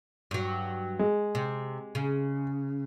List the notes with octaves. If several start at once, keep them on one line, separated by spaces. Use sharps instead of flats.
G2 F#3
G#3
C3
C#3